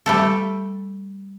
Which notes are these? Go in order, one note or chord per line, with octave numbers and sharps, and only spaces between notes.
G3 A3 A4